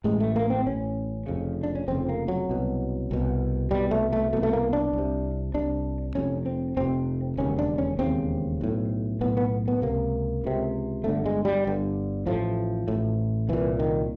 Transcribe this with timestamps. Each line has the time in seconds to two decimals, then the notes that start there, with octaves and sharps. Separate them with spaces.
0.04 A1 A2 G#3
0.20 A3
0.36 A#3
0.50 C4
0.66 A1 A2 C#4
1.26 F1 F2 C#3
1.63 D4
1.75 C#4
1.88 F1 F2 C#3 C4
2.09 A#3
2.28 F#3
2.49 C2 B2
3.11 C2 B2
3.71 C2 B2 G3
3.91 A3
4.13 A3
4.33 B2 A3
4.37 C2
4.43 A3
4.53 A#3
4.73 D4
4.93 C2
4.98 C3
5.54 C2 C3 D4
6.15 F1 F2 C3 C#4
6.46 C4
6.77 F1 F2 C3 C4
7.37 E1 D#2 C#3 C#4
7.59 D4
7.78 C#4
7.99 E1 D#2 C#3 C4
8.61 B1 A2
9.21 B1 A2 B3
9.37 B3
9.68 B3
9.82 C#2 C3 A#3
10.44 C#2 C3
11.04 G1 G2 D3 A3
11.26 G#3
11.45 G3
11.65 G1 G2 D3
12.26 A1 A2 F3
12.88 A1 A2
13.49 C2 A#2 E3
13.79 D#3